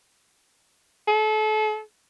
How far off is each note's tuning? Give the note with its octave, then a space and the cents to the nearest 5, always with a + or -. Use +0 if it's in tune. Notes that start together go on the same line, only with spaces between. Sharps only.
A4 -35